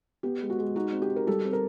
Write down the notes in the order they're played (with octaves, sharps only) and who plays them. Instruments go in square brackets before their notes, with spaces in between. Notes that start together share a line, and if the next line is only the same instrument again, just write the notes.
[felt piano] B3 G4
G#3
F#4
G#3
D#4 F#4
C4
G4
D#4
A#4
G3 G4 A4
C4
A#4